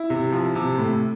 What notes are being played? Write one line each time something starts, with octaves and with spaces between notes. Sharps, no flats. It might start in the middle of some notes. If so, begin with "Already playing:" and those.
Already playing: E4
C3
F3
C3
A2